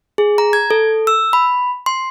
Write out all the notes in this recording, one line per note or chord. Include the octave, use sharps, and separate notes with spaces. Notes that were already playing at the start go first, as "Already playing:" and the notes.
G#4
A#5
G#6
A4
E6
B5
C6